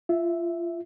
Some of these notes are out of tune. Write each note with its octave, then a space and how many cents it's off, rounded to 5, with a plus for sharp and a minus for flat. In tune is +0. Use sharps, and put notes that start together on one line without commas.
F4 -25 E5 +0